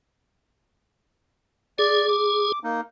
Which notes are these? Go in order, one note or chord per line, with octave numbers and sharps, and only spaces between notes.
G#4 D5
D6
A#3 D#4